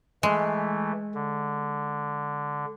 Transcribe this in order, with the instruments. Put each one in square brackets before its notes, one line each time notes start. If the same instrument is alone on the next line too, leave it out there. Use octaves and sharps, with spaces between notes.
[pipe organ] E3 A3 [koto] G#3
[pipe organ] D3